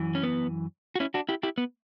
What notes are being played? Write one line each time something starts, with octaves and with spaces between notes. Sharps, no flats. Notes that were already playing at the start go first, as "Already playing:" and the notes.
Already playing: F#2 E3
C#4
B3
F#4
C#4 E4
D4 F#4
E4 G4
E4 G4
B3